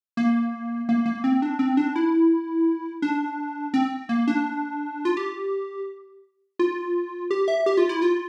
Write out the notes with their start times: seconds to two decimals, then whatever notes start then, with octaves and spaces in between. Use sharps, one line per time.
0.17 A#3
0.89 A#3
1.06 A#3
1.24 C4
1.42 D4
1.59 C4
1.77 D4
1.96 E4
3.02 D4
3.74 C4
4.09 A#3
4.27 D4
5.05 F4
5.17 G4
6.59 F4
7.31 G4
7.48 E5
7.66 G4
7.77 F4
7.89 E4
8.02 F4